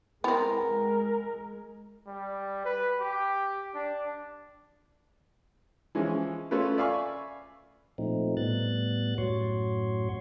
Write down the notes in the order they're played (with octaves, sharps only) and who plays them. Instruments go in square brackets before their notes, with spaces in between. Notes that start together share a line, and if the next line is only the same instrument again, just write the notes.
[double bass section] G#3 [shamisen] B3 C4 [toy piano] E4 B5 [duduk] A#4
[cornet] G3
B4
G4
D4
[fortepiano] E3 F3 G#3 C#4
A3 C#4 F4 A4 B4
D5 E5 F5 G#5 B5 C#6
[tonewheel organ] A#2 F3 A3 C4 D#4
A2 G3 B3 F#6 A6
F#2 A2 F#4 C#5 C6 C#6